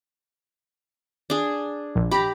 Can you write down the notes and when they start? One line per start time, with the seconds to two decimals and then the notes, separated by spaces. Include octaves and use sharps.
1.30 D4 G#4
1.95 A#1
2.11 G4 A#5 B5